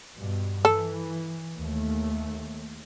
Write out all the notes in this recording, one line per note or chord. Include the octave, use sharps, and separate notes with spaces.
G2 B2
E3 A4
D#2 A3